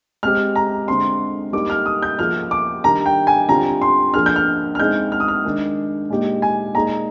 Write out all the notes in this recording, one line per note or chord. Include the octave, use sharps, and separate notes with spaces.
G#3 C4 G4 F6
A#5
D3 G#3 C4 C6
G3 A#3 D#4 D6
F6
D#6
G6
F3 A#3 F4 G#4 F6
D6
D#3 G3 D4 A#5
G5
G#5
D3 G3 C4 F4 A#5
C6
F3 A#3 D4 G#4 F6
G6
F6
F6
G#3 C4 D#4 G#4 G6
F6
D#6
F6
D#3 G#3 D4
A#2 G#3 D#4 G4
G#5
A#2 G#3 D#4 G#4 A#5